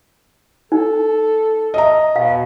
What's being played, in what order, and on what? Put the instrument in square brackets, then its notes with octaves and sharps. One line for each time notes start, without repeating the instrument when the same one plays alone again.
[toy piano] D#4 [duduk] A4
[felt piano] D#5 E5 A#5
[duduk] B2 [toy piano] F5